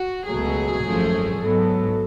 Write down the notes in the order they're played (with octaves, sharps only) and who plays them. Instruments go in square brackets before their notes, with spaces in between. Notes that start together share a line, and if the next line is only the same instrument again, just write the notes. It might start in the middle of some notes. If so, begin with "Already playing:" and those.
Already playing: [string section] F#4
C#2 B2 F#3 A3 G#4
G#1 F#2 F3 A3
G#2 F#3 B3 A4